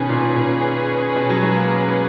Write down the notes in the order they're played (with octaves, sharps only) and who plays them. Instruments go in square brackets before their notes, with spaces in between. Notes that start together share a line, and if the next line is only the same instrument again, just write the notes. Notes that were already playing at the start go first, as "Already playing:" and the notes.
Already playing: [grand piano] B2 D#3 [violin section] C#4 G#4 B4
[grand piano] A#2
A#2
B2
F#3
G#3
A#3
B3